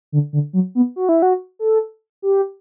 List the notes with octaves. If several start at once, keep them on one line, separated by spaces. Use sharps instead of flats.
D3
D3
F#3
B3
F#4
E4
F#4
A4
G4